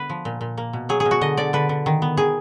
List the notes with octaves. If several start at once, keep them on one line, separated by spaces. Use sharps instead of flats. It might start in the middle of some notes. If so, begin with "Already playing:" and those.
Already playing: D3 B3 B4
F3
A#2
A#2
A#3
B2
F#3 G#4
G#4
B2
F#4
D3 D#5
D3 D5
D3 B4
D3
D#3
B3
D#3 G#4